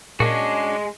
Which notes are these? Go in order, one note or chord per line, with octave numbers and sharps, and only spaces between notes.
A#2 G#3 C#4 D4 F#4 G#4